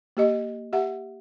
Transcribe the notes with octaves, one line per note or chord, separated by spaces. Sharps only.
A#3 G4 D#5
G4 E5 F#5